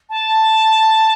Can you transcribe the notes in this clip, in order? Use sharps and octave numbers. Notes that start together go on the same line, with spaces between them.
A5